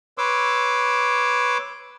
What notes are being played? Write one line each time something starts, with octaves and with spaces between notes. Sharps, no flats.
B4 C#5 C6 D6 E6